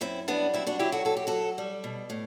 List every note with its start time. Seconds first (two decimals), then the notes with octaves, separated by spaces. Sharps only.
0.01 F#2 C4 E4
0.28 G3 B3 D4
0.53 F#2 C4 E4
0.67 D4 F#4
0.79 F#3 E4 G4
0.92 F#4 A4
1.05 F#2 A4
1.17 G4
1.27 F#3 F#4 A4
1.58 G3
1.84 B2
2.10 A2